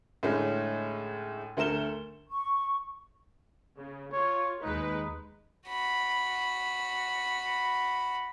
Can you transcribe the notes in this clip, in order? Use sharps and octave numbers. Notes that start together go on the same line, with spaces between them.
A2 D3 G#3 A3 C#4
D2 A3 A#4 E7 G7
C#6
C#3
F4 C#5
D#2 G#3 D#4 B4
F#4 B5